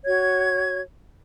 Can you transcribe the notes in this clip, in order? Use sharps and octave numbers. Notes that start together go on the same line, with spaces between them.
F#4 C#5 G#6